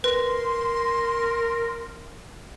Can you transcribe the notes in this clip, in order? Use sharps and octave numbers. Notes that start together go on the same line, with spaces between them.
A#4 B4 C6